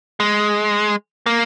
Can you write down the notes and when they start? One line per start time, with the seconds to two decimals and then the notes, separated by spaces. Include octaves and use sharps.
0.20 G#3
1.26 A#3